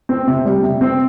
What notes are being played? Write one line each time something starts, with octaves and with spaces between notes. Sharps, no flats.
C4
C3
G3
C3
C4